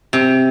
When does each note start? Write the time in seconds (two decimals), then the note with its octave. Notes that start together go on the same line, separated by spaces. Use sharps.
0.13 C3